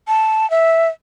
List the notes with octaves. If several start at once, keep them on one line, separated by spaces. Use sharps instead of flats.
A5
E5